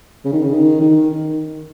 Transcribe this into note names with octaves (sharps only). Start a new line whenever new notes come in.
C#3
D#3
C#3
D#3
D#3